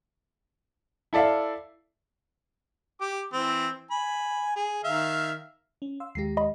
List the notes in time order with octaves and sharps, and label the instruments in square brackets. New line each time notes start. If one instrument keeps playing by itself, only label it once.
[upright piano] E4 A4 D5 E5 F5
[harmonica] G4 D6
E3 C4
G#5 B5
G#4
D#3 E5 F5
[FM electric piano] C#4
F5 C6 E6
[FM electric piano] D#2 G#3 G4 [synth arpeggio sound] A#6 C7
[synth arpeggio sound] D#5 B5